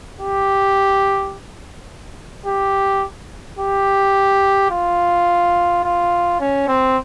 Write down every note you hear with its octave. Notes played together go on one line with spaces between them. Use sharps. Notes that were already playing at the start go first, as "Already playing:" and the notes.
G4
G4
G4
F4
F4
C#4
C4